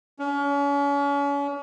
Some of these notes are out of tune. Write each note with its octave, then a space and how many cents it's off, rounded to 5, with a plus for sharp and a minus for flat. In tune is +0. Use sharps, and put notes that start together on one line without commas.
C#4 +40